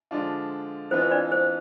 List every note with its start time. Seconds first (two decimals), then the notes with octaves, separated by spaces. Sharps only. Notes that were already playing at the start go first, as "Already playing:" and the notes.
0.11 D3 F3 G#3 D4 F4
0.91 F2 E3 B3 F4 C5
1.01 C5
1.11 D4 D5
1.32 C5